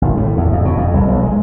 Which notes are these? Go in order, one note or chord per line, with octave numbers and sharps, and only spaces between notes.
G#1
A2
E2
F2
B2
F2
C2
B1
G#3